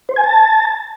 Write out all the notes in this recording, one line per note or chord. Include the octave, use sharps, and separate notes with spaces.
C5
G#5
A5